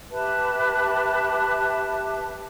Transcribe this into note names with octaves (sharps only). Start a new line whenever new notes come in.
G4 B4 E5 A5